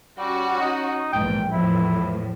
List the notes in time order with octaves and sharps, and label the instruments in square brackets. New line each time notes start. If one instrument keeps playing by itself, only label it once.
[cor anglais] G3 [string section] C#4 F#4
[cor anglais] D#4
[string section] A#1 E2 G#2 [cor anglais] G5
[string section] E2 A2 F3 [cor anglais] E4